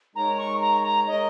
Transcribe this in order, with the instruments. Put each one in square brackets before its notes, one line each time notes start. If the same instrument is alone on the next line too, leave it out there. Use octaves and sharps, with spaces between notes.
[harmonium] G#3 D#4 A#4 C#5 [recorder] A#5
[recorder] C#6
A#5
A#5
[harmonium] G#3 D#4 A#4 C#5 [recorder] D#5